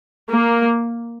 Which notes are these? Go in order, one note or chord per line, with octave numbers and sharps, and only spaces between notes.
A#3